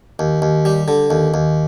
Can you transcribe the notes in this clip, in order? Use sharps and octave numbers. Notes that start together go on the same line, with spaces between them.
D#2
D#2
G3
D3
D#2
D#2